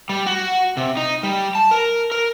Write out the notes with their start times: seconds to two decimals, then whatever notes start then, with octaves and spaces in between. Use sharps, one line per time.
0.09 G3
0.26 F#4
0.77 C3
0.97 D#4
1.23 G3
1.55 A5
1.71 A#4
2.12 A#4